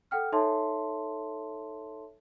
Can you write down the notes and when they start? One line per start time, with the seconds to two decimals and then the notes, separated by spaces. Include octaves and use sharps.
0.11 A4 F#5 G5 F6
0.32 D#4 A4 C#5 E5 A5 C6